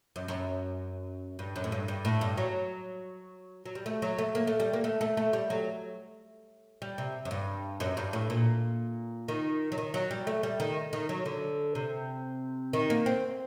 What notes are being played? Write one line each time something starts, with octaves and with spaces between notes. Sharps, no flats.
F#2
F#2
G2
F#2
A2
G2
G2
A2
G2
F#3
F#3
G3
A3
F#3
A3
A#3
A3
G3
A#3
A3
A3
A3
G3
F#3
G3
C3
F#2
G2
F#2
G2
A2
A#2
D#3
F#3
D#3
F#3
G3
A3
G3
D#3
D#3
F#3
D3
C3
D#3
A#3
C4